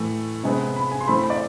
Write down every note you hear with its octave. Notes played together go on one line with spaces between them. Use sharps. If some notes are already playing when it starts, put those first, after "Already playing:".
Already playing: A2 E3 A3
C3 G#3 B3
B5
G#5
C6
E3 A3 C4 B5
B5
D5